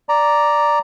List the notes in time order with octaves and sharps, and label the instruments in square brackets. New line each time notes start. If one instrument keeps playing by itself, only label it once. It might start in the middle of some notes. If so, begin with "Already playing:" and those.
[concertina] D5 A#5